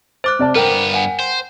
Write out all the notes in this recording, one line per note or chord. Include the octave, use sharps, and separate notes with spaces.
C5 D6 F#6 A6
C3 D5 A5
G2 B3 A#4 G5
F#5 G#5
C5